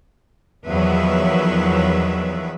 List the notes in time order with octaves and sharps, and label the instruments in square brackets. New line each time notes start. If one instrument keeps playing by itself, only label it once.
[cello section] E2 D#3 F3 F#3 B4 E5